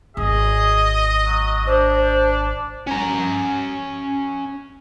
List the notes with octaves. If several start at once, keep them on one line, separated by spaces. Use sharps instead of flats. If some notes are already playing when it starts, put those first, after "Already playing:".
G#1 D#3 G#4 D#5
F#3
D4 C5
C#4 A#5